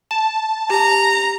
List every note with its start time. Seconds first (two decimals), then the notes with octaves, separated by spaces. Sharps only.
0.11 A5 E7
0.70 G4 A#5